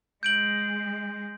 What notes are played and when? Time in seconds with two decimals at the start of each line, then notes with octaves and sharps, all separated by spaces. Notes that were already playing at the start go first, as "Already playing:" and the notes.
0.23 G#3 G6 D7 F#7